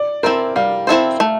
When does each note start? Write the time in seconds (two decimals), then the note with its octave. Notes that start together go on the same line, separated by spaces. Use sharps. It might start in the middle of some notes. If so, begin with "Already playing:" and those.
Already playing: D5
0.23 C4 E4 A4 A#4 C5
0.56 G3 F5
0.87 C4 E4 A4 C5
1.20 A3